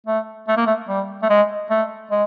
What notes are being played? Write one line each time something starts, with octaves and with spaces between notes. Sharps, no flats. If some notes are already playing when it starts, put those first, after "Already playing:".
A3
A3
A#3
A3
G3
A3
G#3
A3
G#3